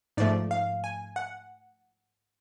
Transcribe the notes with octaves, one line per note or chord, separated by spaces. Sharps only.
G#2 F3 A3 D5
F5
G#5
F#5